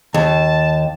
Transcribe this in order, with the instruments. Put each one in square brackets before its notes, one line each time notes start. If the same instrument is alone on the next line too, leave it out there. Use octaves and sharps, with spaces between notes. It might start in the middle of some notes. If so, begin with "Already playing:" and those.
[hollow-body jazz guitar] D#2 [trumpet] A5